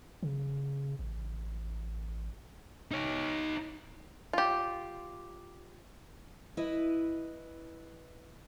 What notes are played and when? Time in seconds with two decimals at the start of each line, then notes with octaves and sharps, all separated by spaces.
0.23 C#3
0.99 A1
2.91 D#4 C#5
4.33 F4 G4
6.57 E4 B4 D#5